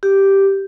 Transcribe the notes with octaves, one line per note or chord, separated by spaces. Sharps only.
G4